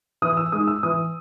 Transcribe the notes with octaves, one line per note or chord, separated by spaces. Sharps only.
E3 D#6
E6
G#3 D#4 D#6
E6
E3 D#6